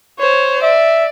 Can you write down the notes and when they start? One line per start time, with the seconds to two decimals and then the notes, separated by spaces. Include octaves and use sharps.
0.19 C5 C#5
0.62 D5 E5